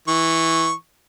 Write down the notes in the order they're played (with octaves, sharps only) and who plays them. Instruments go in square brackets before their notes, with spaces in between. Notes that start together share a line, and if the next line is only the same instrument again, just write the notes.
[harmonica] E3 C#6